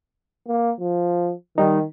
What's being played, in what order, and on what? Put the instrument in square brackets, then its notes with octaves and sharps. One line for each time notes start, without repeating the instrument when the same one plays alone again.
[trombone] A#3
F3
[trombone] D#3 [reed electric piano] G3 D#4